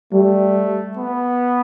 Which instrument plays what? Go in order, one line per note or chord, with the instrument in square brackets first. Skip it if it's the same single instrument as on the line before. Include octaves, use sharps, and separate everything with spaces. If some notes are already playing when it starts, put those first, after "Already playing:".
[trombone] G3 [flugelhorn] A3
[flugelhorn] B3